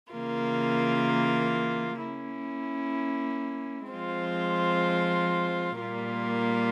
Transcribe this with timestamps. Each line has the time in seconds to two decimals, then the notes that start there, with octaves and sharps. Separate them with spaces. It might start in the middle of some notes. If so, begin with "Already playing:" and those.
0.12 C#3 E3 A#3 F4 A#4
2.01 A#3 C#4 E4
3.90 F3 G#3 C4 F4 C5
5.79 A#2 G3 A#3 F4 A#4